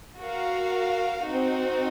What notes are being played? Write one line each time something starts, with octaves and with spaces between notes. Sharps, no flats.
F#4 A#4 F5
C4 D#4 F#4